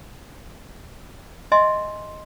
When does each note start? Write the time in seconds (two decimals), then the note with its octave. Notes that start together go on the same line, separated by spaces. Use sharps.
1.52 D#5 E5 G#5 C6